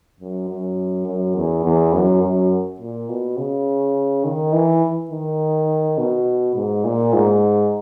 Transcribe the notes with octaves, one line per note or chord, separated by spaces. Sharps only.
F#2
F#2
F#2
E2
E2
F#2
F#2
A#2
B2
C#3
D#3
E3
D#3
B2
G#2
A#2
G#2